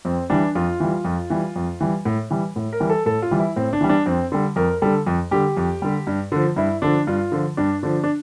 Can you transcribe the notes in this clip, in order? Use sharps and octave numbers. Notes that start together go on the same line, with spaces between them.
F2 C4
E3 G3 D4
F2 F4
E3 G3
F2
E3 G3
F2
E3 G3
A2
E3 G3
A2
A#4
E3 G3
A4
A2 A4
F4
E3 G3
E4
A2 C4
D4
E3 G3
D4
F2 C4
D3 G3
F2 A#4
D3 G3 A4
F2
D3 G3 G4
F2
D3 G3
G2
D3 F3
G2 E4
D3 F3 D4
G2 F4
D3 F3
G2 D4
D3 F3 D4
D4